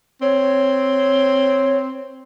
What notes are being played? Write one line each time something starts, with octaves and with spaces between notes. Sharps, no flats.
C4 C#5